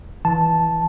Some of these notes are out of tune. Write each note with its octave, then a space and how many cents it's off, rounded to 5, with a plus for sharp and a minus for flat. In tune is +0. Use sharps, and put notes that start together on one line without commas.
E3 -5 A5 -5